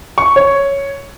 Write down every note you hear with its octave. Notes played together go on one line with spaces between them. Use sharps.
C#6
C#5